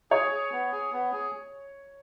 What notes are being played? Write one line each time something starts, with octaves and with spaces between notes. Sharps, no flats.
G#4 C#5
G#4
B3
G#4
B3
G#4